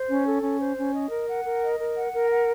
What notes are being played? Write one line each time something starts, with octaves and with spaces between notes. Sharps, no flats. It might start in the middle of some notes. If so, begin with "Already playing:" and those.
Already playing: C5
C#4
A4
C#4
C5
C#4
D#5
A#4
F#5
A#4
D#5
A#4
F#5
A#4
F#5